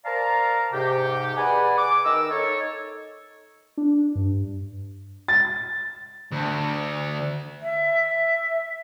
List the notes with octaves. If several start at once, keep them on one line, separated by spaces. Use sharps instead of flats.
A#4 C5 D5 F5 A5 A#5
G#2 C3 G4
G#4 B4 D5 F#5 G#5
D6
D#3 D#4 A#4 E6
D#4 A4 C#5
D4
G2
A6
D2
E5